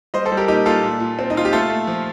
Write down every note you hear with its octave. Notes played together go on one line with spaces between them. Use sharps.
G3 C5 D#5
A4 C5
G3
G4 A#4
A#2 D#4 G4
A#2 F4 A4
A#2
A#2
C4
D#4
A#2 F4
G4
A3 F4 A4
A3
F3